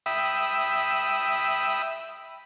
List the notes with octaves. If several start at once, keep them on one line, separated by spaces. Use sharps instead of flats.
E5 G5 B5 D#6 E6